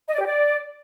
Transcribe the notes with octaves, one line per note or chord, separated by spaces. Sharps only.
D#5
D5
G4
D5